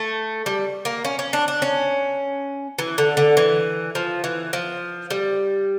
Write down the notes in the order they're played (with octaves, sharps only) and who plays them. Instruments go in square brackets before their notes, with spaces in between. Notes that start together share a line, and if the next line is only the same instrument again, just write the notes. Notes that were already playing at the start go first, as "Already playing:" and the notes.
Already playing: [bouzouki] A3
G3
A#3
C#4
C#4
D4
D4
C#4
E3
D3
D3
E3
F3
E3
F3
G3